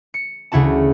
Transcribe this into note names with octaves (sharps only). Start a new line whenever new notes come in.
C#7
D2 C#3 E4 F#4 A5